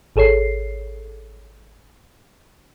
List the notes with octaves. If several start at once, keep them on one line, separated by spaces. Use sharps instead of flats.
G#1 G#4 A4 C#5 C7